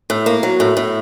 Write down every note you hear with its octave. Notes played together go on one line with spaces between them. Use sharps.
A2
A#3
F#3
A2
A2